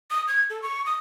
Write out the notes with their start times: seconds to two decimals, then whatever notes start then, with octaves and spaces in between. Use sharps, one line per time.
0.11 D#6
0.28 G#6
0.50 A4
0.62 C#6
0.86 D#6